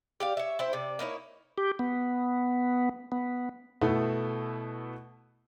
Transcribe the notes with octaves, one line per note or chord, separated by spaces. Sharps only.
G4 D5 F5
C#5 E5
C4 E4 C5
C3 D5
A#3 D#4 E4 C#5
G4
B3
B3
B2 A3 B3 E4